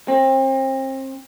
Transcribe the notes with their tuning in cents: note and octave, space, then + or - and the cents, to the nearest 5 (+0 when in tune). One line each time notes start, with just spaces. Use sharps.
C4 +35